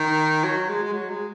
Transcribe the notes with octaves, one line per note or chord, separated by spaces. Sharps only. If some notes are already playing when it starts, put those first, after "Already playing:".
Already playing: D#3
F#3
G#3
G#3
F#3
G#3